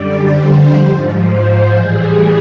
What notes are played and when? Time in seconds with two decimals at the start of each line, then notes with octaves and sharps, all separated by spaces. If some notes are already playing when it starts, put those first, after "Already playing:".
Already playing: F#2 D3 G3 D5
0.27 F2 D3 G3 C5
0.75 G#2 F3
1.24 G#2 F3 C5
1.72 A2 E3 G3 G#4